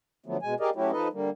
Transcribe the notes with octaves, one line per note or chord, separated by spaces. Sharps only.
D3 F3 F#3 A3 B3
B2 G#3 G#5
G4 G#4 A#4 D5 D#5 F5
F#3 A3 C#4 E4 F#4 G4
F3 D#4 A4 B4 D#5
D3 G3 A#3